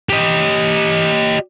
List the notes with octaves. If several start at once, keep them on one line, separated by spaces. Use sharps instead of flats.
G4 D#5